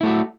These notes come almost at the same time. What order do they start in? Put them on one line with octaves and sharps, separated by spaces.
E4 A3 F#4